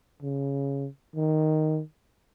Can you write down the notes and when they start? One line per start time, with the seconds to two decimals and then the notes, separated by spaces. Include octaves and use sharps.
0.23 C#3
1.16 D#3